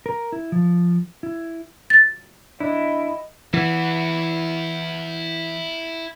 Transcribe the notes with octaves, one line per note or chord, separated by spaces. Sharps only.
A#4
E4
F3
E4
A6
E2 D4 E4 D#5
E3 E4 F#5